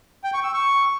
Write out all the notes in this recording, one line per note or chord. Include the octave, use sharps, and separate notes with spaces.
G5
C#6
E6
C#6